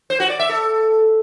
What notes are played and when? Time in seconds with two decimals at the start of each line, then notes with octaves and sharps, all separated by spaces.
0.10 C5
0.20 F#4
0.30 D5
0.40 E5
0.49 A4